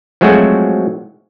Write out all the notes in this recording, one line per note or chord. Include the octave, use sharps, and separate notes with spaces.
F3 F#3 G#3 A3 C4 F#4